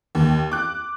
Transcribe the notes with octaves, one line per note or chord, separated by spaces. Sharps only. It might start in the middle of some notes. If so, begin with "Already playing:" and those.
D#2
D6 F#6